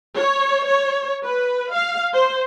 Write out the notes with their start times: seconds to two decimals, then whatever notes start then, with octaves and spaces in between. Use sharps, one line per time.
0.18 C#5
0.66 C#5
1.23 B4
1.73 F5
2.14 C5